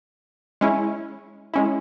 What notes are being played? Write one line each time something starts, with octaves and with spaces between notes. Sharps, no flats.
G#3 C#4 E4
G#3 C#4 E4